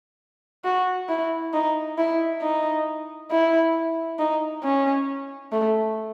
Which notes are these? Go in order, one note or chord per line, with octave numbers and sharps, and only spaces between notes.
F#4
E4
D#4
E4
D#4
E4
D#4
C#4
A3